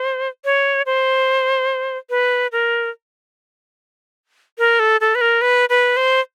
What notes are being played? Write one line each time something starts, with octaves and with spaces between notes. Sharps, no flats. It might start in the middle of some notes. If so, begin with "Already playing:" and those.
Already playing: C5
C#5
C5
B4
A#4
A#4
A4
A4
B4
A#4
B4
B4
C5